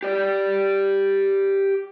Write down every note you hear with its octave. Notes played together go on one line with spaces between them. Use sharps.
G4 D5